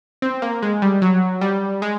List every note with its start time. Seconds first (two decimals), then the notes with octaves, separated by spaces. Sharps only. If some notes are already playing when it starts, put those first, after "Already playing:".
0.22 C4
0.42 A#3
0.62 G#3
0.82 G3
1.02 F#3
1.41 G3
1.82 G#3